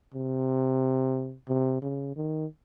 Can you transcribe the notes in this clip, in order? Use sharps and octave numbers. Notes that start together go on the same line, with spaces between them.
C3
C3
C#3
D#3